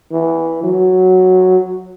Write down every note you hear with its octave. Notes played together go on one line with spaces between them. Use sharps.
E3
F#3